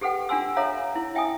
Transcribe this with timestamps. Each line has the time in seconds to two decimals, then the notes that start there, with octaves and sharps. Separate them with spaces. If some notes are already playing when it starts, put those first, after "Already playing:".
0.01 G4 A4 B4 F#5 G5
0.29 D4 F4 F#5 G#5 C6 E6
0.56 A4 C#5 E5 F5 A#5
0.96 E4
1.15 E5 G5 G#5 D#6